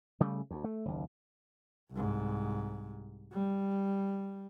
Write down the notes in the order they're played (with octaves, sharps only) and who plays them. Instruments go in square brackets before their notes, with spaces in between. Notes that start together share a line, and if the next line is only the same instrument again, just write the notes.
[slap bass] C#3 G3 A3
D2
A3
F#1 D#2
[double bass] C2 G#2
G3